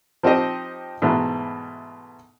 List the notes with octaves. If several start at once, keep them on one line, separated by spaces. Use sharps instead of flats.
F3 C4 D#4 G4 D#5
G#2 B2 E3 A3